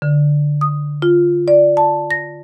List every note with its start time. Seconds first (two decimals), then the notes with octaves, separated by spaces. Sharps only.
0.02 D3
0.61 D#6
1.02 F4
1.48 D5
1.77 A5
2.11 A#6